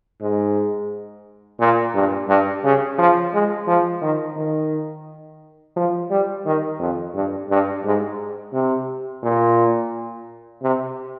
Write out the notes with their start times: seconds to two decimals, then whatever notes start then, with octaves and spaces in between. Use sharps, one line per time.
0.21 G#2
1.59 A#2
1.94 G2
2.28 G2
2.64 C#3
2.98 F3
3.33 G#3
3.67 F3
4.02 D#3
4.36 D#3
5.76 F3
6.10 G3
6.46 D#3
6.79 F2
7.15 G2
7.50 G2
7.84 G#2
8.53 C3
9.23 A#2
10.62 C3